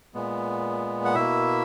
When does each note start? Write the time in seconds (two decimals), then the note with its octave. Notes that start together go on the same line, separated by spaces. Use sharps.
0.14 A#2 G#3 B3
1.05 F#5
1.15 B2 A#3 E4 E5